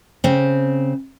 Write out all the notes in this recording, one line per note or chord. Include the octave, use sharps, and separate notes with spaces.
C#3 C4